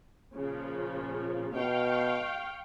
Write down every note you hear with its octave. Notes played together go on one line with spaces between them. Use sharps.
A#2 C#3 F3
B2 F5 G5 C#6